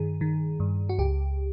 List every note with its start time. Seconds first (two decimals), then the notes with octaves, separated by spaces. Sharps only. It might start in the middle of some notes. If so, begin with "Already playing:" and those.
Already playing: G2 D#3 G#4
0.21 D#3
0.60 G2
0.89 F#4
0.98 C#2 G4